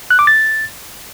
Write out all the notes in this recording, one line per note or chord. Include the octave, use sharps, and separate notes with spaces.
F#6
D6
A6